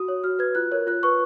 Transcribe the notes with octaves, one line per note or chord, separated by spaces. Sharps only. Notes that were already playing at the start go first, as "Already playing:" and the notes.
Already playing: F#4 D#6
C#5
F#4 F6
B4 G#6
F4 F#6
A#4 C#5
F4 F#6
B4 C#6